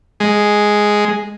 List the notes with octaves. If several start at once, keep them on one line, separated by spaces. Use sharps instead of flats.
G#3